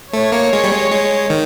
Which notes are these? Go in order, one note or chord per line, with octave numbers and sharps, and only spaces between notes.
A3 C#5
A#3
G#3
G3
G#3
G#3
D#3